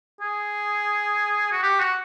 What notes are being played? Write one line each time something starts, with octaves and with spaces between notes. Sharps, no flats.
G#4
F#4
G4
F#4